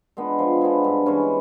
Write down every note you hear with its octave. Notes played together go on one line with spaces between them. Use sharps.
G#3 B3 D4
F3
G#3 B3 D4
G2
E3 G#3 C#4